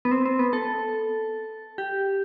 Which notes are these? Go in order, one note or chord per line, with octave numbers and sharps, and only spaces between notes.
B3
C4
C4
B3
A4
G4